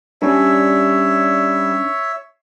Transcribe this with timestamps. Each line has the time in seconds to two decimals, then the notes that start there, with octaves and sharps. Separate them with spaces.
0.22 G3 C#4 D4 C#5 E5